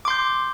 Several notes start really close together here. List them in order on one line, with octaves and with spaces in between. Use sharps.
D6 C6 G6